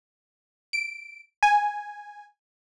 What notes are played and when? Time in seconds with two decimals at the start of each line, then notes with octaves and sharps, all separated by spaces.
0.73 D7
1.43 G#5